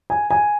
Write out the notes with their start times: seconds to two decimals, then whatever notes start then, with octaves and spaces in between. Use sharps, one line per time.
0.10 G#5
0.30 G#5